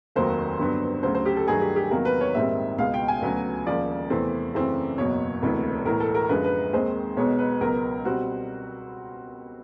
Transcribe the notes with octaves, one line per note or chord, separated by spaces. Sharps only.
F1 D#2 D#3 F#3 A#3 C5
G2 D3 F#3 B3
D2 C#3 F#3 C5
C5
G4
A4
G2 D#3 F#3 A3 G#4
G4
G4
E2 C3 D#3 F#3 A#3 A#4
B4
C#5
A#1 G#2 D#3 G3 C4 E5
C#2 B2 G#3 F5
G5
G#5
D2 C#3 F#3 B3
E1 D#2 C#3 F3 D5
E2 C3 E3 A3 C4
F#2 C#3 E3 A3 C4
F#1 E2 B2 F#3 C#5
E1 D2 C3 E3
B1 A2 E3 A#4
A4
A#4
F#2 D3 F3 G#3 B4
B4
D#2 D#3 G#3 C4 C5
B1 B2 G#3 B3 C#5
B4
C#2 B2 F#3 B3 A#4
B2 G3 C4 F#4